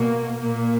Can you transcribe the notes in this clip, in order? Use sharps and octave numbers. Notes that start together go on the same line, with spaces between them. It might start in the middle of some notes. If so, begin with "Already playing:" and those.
Already playing: B2 A#3
A#2 A#3